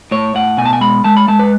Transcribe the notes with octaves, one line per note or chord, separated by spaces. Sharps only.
A2 C#5
A2 F#5
B2 G#5
A5
G#5
G#3 B5
G#3 A5
B5
G#3 A5
B4